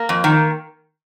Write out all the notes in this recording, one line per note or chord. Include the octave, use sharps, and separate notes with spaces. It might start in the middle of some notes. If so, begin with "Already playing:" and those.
Already playing: A#3
F2
D#3